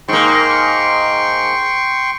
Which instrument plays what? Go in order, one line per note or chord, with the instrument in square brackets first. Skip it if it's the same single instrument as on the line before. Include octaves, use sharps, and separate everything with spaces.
[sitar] G#2 A#3 [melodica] G5 C6 C#6